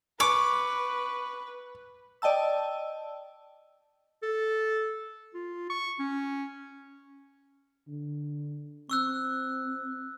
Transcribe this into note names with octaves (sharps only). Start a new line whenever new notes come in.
B4 C#6 D6
D5 D#5 G5 A5 E6
A4
F4
C#6
C#4
D3
C4 C#6 E6 F#6